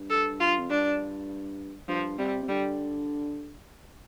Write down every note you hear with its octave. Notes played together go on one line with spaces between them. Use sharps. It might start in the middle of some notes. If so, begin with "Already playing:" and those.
Already playing: G2
A4
F4
F2
G2 D4
G2 F3
C3 G3
C3
D3 G3